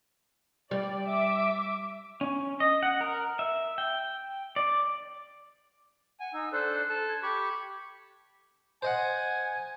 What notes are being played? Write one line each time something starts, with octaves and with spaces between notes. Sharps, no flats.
G3 D5
E5 D6
C#4
D#5
F#5
A#4
E5
G5
D5
F#5 G#5
D#4 E6
D4 A4 C5 F#6
A4 A5
G#6
G4 B5 C#6 D6
C5 D#5 F#5 G#5